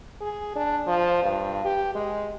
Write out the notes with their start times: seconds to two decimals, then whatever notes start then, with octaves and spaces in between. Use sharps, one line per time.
0.21 G#4
0.56 D4
0.87 F3
1.23 G2
1.65 G4
1.95 G#3